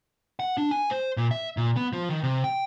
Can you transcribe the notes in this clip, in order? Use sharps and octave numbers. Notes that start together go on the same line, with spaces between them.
F#5
D4
G#5
C5
A#2
E5
A#2
B3
F3
D#3
C3
G5